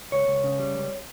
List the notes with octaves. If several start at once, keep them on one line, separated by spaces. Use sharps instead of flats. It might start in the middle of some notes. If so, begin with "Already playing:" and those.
C#2 C#5
C#2
C#3
G3
C#2